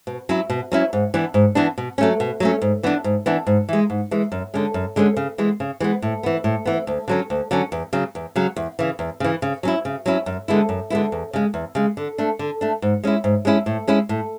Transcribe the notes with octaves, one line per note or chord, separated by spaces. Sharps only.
B2
F#3 C#4 E4
B2
F#3 C#4 E4
G#2
E3 B3 D4
G#2
E3 B3 D4
B2
F#3 A3 C#4
B2
F#3 A3 C#4
G#2
E3 B3 D4
G#2
E3 B3 D4
G#2
E3 G#3
G#2
E3 G#3
F#2
D3 G#3 C#4
F#2
D3 G#3 C#4
C#3
E3 G#3 B3
C#3
E3 G#3 B3
A2
E3 B3
A2
E3 B3
D2
D3 F#3 C#4
D2
D3 F#3 C#4
E2
C#3 F#3
E2
C#3 F#3
E2
C#3 E3
E2
C#3 E3
C#3
F#3 C#4 E4
C#3
F#3 C#4 E4
F#2
D3 G#3 B3 E4
F#2
D3 G#3 B3 E4
E2
C#3 G#3
E2
C#3 G#3
D3
A3 D4
D3
A3 D4
G#2
G#3 C#4 E4
G#2
G#3 C#4 E4
A2
G#3 C#4 E4
A2